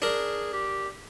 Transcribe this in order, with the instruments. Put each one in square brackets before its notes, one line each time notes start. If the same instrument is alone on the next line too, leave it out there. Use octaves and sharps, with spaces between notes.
[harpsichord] D4 A#4 [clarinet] G#4
[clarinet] G4